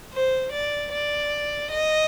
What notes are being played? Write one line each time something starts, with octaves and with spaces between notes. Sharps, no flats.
C5
D5
D5
D#5